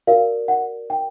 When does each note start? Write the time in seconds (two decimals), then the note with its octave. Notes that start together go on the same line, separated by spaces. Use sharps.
0.07 F#4 A#4 D5 F5
0.48 F#5
0.90 G5